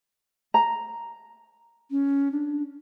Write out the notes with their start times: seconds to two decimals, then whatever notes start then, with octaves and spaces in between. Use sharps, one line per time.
0.54 A#5
1.91 C#4
2.32 D4